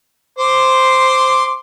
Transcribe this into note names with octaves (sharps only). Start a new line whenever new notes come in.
C5 C6 D6